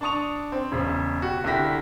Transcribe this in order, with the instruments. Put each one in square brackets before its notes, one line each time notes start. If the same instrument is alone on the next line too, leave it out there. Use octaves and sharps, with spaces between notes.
[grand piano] D4 A5 C#6 D#6 F7
C4
E1 C#3
F#4 G4
C2 D3 E4 G4 A#6 B6